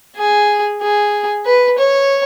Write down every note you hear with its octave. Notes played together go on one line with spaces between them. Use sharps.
G#4
G#4
B4
C#5